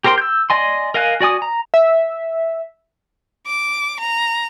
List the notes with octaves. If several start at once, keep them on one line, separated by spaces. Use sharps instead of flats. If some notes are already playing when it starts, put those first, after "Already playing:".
G4 A#4 C5 G5 C6
E6 G6
D5 D#5 G#5 C6
A#4 D#5 F5 G#5 F#6
F#4 D5 G#5 D#6
A#5
E5
D6
A#5